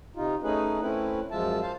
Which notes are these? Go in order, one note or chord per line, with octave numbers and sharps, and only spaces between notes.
C3 D#4 F4
A3 C#4 D#4 G#4 B4
A3 C4 C#4 E4 B4
F#2 F3 G#3 F4 E5 A5
C5 F5 A5